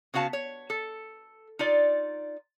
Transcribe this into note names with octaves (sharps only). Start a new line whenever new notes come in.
C#3 B3 F#4 F5 A5
C#5
A4
D#4 F4 D5